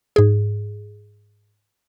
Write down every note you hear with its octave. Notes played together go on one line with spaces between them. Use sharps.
G#2 G#4